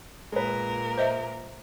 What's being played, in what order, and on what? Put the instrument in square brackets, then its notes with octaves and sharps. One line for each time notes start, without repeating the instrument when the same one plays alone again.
[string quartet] A#2 A#4 [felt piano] G#3 B4
[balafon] C5 D#5 E5